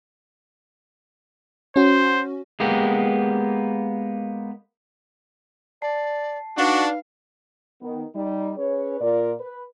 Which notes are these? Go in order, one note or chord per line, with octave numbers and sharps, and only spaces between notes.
C#4 F#4 C5
G#3 A#3 B3 G4
D5 A5 C7
D4 D#4 F#4 B4 F5
D#3 B3
G3 D#4
C#4 G#4 B4 C#5
A#2 F4 A#4 D5
B4